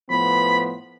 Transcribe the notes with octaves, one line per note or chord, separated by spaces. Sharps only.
A2 F3 B3 B5